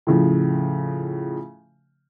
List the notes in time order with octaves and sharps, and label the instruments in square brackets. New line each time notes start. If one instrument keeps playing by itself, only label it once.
[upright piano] A2 C#3 F3